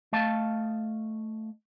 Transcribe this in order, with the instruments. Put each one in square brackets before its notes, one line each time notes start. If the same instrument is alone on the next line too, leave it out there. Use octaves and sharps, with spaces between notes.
[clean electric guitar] A3 D#5 F5 A5